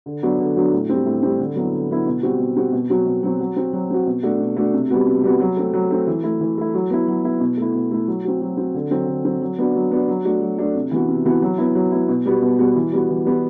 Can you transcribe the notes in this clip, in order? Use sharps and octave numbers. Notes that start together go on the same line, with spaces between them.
D3
F#3 B3 D4 F#4
D3
F#3 B3 D4 F#4
A2
G3 C4
A2
G3 C4
D3
F#3 B3 E4
D3
F#3 B3 E4
B2
G3 C4 F#4
B2
G3 C4 F#4
B2
F#3 C4 F#4
B2
F#3 C4 F#4
F#3
C4 F#4
F#3
C4 F#4
B2
A3 D4 F#4
B2
A3 D4 F#4
C3
G3 B3 F#4
C3
G3 B3 F#4
F#3
A3 C4
F#3
A3 C4
E3
A3 E4
E3
A3 E4
F#3
B3 E4
F#3
B3 E4
B2
A3 E4
B2
A3 E4
F#3
C4 F#4
F#3
C4 F#4
D3
F#3 C4
D3
F#3 C4
F#3
B3 D4 F#4
F#3
B3 D4 F#4
F#3
A3 D4 F#4
F#3
A3 D4 F#4
C3
E3 B3 F#4
C3
E3 B3 F#4
F#3
B3 E4
F#3
B3 E4
B2
G3 B3 F#4
B2
G3 B3 F#4
E3
G3 B3 F#4
E3
G3 B3 F#4